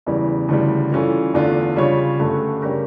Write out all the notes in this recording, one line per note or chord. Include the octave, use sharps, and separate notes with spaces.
E2 C#3 E3 G3
D2 C#3 E3 G3
E3 G3 C#4 F4 A4
E2 D3 A3 D4 F4
C#3 G3 C#4 F4 C#5
G2 D3 A3 C#4
C#3 G3 C#4 G4 A#4